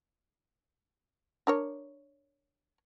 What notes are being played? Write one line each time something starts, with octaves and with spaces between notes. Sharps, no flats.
D4 A#4 C#5